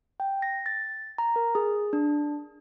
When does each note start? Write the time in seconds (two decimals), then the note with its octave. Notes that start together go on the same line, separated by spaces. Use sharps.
0.20 G5
0.42 A#6
0.66 A6
1.18 A#5
1.36 A#4
1.55 G#4
1.93 D4